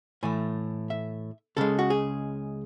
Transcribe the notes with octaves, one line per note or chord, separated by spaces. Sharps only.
A2 E3 A3 G#5
E5
C#2 C#3 G#3 A4
F#4
G#4